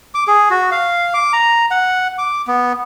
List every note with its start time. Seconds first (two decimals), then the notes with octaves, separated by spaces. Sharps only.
0.14 D6
0.27 G#4
0.50 F#4
0.71 F5
1.14 D6
1.33 A#5
1.71 F#5
2.18 D6
2.47 B3